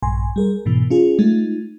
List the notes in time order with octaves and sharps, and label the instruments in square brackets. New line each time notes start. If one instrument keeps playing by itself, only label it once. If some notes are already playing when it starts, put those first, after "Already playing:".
[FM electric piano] A#1 G2 G#5 C6
G3 G#4 A#4
G#2 B2 E3
C#4 F4 G#4
G#3 A3 D#4 F4